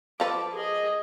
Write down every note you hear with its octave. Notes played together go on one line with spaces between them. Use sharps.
F3 A4 B4 D6
G#4 D#5